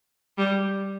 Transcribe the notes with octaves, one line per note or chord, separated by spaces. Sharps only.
G3